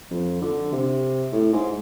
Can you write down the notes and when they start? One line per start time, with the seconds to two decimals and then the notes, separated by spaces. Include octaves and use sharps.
0.11 F2
0.41 D3
0.72 C3
1.32 A2
1.53 G#2